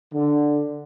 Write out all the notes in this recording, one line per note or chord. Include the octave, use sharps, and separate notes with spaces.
D3